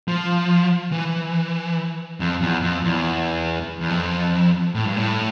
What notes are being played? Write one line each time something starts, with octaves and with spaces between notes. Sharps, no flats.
F3
E3
F2
E2
F2
E2
E2
F2
A2
G2
A2